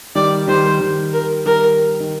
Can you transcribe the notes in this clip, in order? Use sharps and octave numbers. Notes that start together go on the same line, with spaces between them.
D#3 G3 D5
D#3 G3 C5
D#3 G3
A#4
D#3 G3 A#4
D#3